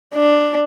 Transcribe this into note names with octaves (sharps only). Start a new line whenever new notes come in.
D4